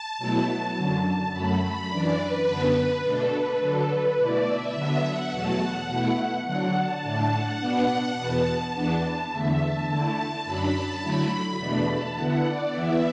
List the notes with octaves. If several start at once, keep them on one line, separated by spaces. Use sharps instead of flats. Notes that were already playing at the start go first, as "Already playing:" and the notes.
Already playing: A5
B2 F#3 A3 E4
A5
F#2 D3 F#3
F#2 F#3 A3 B5
B5
F#2 E3 D4 D5
B4
F#2 D3 B3 D4
B4
B2 A3 D4 A4
B4
D3 F#3 D4 A4
B4
B2 A3 E4 D5
E5
D3 F#3 B3 D4
F#5
E2 B2 F#3 A3 A5
F#5
B2 A3 E4
D3 F#3 D4 F#5
A5
A2 A3 D4
F#5
B2 B3 D4
E2 B2 B3 A5
E2 E3 B3 D4 A5
E2 D3 A3 E5
A5
D3 A3 E4
F#2 F#3 D4 B5
A5
D3 F#3 A3 E4 B5
E2 B2 A3 D4
A5
D3 B3 E4 F#5
D5
E2 E3 B3 E4 E5